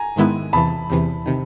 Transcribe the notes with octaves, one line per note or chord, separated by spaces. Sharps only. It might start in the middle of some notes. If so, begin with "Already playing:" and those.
Already playing: G#5 A#5
G#2 D#3 G#3 B3 E4
E2 C3 E3 A5 B5
E2 C3 E3
C3 D#3